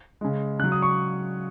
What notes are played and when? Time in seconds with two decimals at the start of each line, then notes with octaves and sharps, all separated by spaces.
0.21 C#3 G#3
0.59 C#3 F#3 F#6
0.72 D#6
0.82 C#6